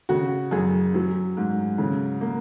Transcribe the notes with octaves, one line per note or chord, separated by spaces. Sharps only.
C#3 F#4
F#2 G#4
F#3
G#2
C#3
A#3